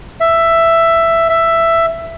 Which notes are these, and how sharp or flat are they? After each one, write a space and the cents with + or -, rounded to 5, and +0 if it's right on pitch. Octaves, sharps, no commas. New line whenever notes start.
E5 +10
E5 +10